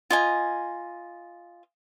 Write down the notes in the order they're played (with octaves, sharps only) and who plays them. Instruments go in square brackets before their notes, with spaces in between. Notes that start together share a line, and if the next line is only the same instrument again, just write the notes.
[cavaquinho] F4 D#5 G#5